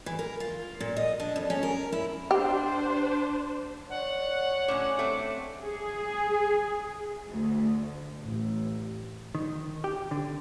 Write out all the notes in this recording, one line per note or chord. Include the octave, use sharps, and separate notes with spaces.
E3
A#4
F4
A#2
D#5
D4
F2
C#4
A#4
E4
D4 G4 C5
C#5 D5 F#5
A2 D3 C#4 D6
A3 C4
G#4
D2
A1
D#3
G4
D3